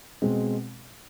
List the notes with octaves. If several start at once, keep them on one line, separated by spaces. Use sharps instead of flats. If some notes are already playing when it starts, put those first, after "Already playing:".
B2 G#3 C4